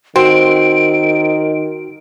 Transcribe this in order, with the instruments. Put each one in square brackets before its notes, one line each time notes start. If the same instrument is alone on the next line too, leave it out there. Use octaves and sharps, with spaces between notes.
[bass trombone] D#3 [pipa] C4 [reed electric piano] F#4 [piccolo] D7